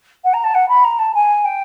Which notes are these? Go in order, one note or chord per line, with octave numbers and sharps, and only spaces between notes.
F#5
A#5
A5
F#5
B5
A#5
A5
G#5
G5